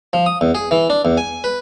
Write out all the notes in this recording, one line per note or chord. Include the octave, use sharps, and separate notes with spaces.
F3
D#6
E2
G#4
E3
D4
E2
G#5
B4